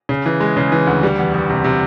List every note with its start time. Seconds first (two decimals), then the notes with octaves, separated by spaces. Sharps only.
0.09 C#3
0.26 E3
0.40 G#3
0.57 C#3
0.72 E3
0.87 D2
1.03 G3
1.19 E2
1.34 E2
1.49 C3
1.64 C3